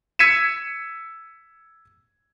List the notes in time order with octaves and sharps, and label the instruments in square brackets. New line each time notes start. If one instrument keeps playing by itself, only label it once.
[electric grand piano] E6 G#6 B6 C#7 D#7 E7